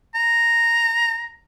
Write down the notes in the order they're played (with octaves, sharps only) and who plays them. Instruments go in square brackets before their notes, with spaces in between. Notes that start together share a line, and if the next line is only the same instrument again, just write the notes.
[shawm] A#5